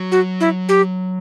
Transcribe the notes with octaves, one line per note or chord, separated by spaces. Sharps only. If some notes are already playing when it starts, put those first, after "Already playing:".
Already playing: F#3
F#4
E4
G4